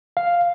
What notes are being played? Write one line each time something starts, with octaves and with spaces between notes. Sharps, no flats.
F5